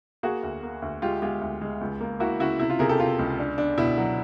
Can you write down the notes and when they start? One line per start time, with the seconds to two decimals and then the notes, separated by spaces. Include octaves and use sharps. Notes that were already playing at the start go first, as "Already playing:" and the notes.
0.23 A#3 F#4 G#4
0.43 D2
0.63 A#3
0.82 D2
1.02 G#3 F4 G4
1.22 G#3 F4 G4
1.41 D2
1.61 G#3
1.81 C#2
2.01 A#3
2.20 A#3 E4 F#4
2.40 C#3 E4 F#4
2.60 C3 E4
2.70 F4
2.79 C3 G#4 A#4
2.89 G4 A4
2.99 C3 F4
3.19 C#2
3.39 D4
3.58 D4
3.78 B2 E4
3.97 F#3